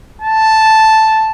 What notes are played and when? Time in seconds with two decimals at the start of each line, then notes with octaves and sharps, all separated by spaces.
0.22 A5